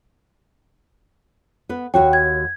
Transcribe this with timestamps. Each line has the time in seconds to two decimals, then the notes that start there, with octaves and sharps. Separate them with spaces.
1.69 B3 B4
1.94 D#2 F#4 C#5 G5
2.13 G#6